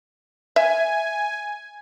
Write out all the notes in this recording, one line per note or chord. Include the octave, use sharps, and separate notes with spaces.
E5 G#5